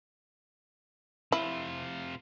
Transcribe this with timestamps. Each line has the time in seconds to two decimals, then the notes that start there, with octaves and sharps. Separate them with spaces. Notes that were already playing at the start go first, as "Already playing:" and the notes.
1.32 C3 E4 F4